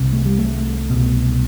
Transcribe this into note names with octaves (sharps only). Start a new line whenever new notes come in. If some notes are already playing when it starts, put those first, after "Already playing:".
Already playing: C2 C3
A3
G3
A3
C2 B2